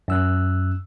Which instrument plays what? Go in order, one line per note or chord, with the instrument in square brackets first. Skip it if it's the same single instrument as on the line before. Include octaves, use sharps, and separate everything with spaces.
[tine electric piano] F#2 E6 F#6